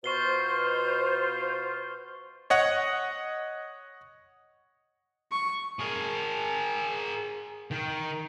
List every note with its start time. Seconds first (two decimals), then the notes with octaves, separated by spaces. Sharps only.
0.04 B2 F4 C5 C#6 C7 G7
2.50 C#5 D#5 F#5
5.32 C#6
5.80 G#4 A#4
7.71 D#3